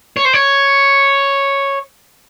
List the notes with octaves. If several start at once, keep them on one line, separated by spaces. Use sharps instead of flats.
C#5
C5
C#5